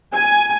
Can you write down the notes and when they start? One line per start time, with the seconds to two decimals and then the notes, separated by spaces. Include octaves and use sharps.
0.14 G#5